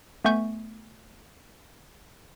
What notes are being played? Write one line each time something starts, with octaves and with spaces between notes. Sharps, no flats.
A3 B3 E5 G#5 C#6 G6